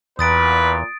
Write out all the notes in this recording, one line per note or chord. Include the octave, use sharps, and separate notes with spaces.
E2 A#2 B4 D#6 A6 D7